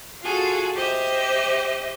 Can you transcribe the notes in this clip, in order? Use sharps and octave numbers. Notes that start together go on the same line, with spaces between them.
F4 F#4 G#4 A4
G4 C5 D#5 E5